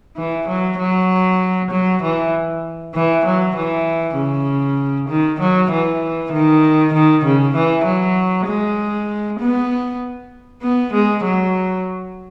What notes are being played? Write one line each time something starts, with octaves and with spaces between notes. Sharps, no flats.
E3
F#3
F#3
F#3
E3
E3
F#3
E3
C#3
D#3
F#3
E3
D#3
D#3
C#3
E3
F#3
G#3
B3
B3
G#3
F#3